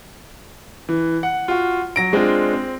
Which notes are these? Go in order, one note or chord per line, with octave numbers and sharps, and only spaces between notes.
E3
F#5
F4 F#4
F#3 A#6 D7
G#3 C4 D4 F4
C4